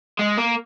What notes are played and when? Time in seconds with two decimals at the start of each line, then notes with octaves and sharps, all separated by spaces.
0.19 G#3
0.37 A#3